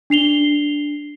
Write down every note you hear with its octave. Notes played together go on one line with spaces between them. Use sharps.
D4 C7 F7 G7